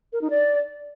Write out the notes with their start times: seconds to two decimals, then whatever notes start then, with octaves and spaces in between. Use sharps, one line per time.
0.13 A#4
0.22 D#4
0.30 D5